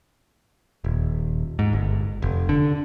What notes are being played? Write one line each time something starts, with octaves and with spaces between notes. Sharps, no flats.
D#1
G#2
G1
F1
D3